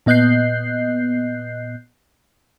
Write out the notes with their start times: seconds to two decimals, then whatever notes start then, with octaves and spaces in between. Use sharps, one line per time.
0.06 A#2 B3 D#5 F#6 G6 C7